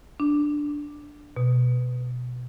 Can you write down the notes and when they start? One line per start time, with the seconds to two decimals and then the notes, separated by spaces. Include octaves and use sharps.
0.20 D4
1.36 B2